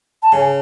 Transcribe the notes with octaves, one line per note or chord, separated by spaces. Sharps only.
A5
C#3 G#5